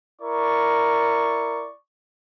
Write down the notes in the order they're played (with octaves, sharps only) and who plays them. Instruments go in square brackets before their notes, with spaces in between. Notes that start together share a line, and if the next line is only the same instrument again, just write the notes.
[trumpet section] E4 D5 C#6 [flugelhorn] A#4